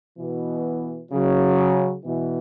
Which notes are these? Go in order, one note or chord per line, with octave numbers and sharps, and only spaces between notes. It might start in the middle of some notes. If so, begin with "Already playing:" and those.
B2 E3
C#3 F#3
B2 E3